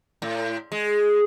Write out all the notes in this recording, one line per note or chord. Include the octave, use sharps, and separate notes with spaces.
A2
G#3